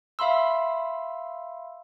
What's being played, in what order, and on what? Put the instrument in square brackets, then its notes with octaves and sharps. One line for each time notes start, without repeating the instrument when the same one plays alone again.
[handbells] E5 F5 B5 C6 E6